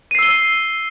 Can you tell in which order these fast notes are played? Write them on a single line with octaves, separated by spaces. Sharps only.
D#7 C7 E6 G7